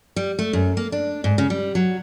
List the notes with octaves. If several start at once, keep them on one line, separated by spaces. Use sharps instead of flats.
G3
A3
F#2
A#3
D4
G#2
C#3
G3
F#3